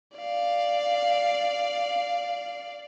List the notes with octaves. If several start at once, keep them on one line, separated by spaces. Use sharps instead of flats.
D5 F5